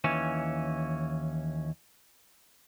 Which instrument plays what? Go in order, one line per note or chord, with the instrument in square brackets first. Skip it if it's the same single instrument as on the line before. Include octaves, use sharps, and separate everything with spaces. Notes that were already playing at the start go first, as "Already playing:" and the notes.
[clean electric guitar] D#2 E3 C#4